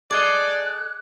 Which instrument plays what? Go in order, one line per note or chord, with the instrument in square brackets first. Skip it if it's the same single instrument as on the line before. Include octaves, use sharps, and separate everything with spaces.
[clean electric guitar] G#4 A4 D#5 [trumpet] D5 [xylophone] D6 [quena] F#6